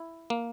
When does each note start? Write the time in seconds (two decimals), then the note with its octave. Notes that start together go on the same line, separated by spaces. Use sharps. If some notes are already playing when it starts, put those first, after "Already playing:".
Already playing: E4
0.30 A#3